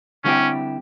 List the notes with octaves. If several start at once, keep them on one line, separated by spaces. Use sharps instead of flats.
D3 G3 C4 C#4 E4 G4